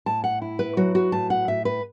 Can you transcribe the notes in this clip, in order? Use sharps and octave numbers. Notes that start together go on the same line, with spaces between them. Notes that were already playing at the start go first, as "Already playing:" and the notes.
A2 A5
F#5
E4
B4
F#3 F#4
F#4
A2 A5
F#5
A2 E5
B4